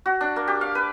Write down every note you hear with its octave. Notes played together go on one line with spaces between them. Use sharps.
F#4
D4
A#3
G4
F5
B4